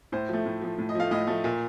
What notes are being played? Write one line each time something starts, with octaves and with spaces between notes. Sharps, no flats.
A2 C5
F3 A3
A2
F3 A3
A2
D#5
F3 A3 F5
A2 D#5
F3 A3
A#2